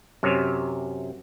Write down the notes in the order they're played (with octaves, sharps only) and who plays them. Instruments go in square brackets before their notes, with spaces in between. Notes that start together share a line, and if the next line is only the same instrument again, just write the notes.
[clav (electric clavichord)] F#2 C3 C#5